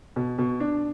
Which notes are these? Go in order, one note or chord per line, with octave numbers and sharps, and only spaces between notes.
B2
B2
D4